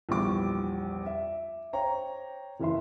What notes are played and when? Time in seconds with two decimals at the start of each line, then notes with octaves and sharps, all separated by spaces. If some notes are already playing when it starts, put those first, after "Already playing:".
0.09 A#1 E2 G3 D6
1.06 E5
1.73 C5 C#5 G5 A#5
2.60 F#1 E3 E5 C6